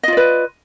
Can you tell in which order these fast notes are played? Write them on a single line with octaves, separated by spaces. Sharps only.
D#5 F4 D5 B4